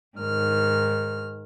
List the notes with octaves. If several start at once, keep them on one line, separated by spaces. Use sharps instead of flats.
G#2 D#3 F6